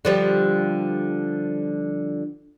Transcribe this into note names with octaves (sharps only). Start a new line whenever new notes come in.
D3 F3 G3